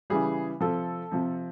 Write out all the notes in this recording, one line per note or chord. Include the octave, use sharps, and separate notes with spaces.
C#3 E3 G3 G#4
C3 F3 A4
C3 F3